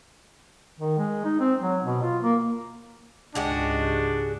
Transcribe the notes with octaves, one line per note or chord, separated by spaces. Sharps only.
D#3
G#3
D#4
C4
F#3
B2
F4
A#3
C#2 G#2 G#3 D4 F#4 G4